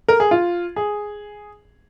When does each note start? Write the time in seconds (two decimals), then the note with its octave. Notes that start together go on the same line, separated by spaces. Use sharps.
0.08 A#4
0.20 G#4
0.31 F4
0.76 G#4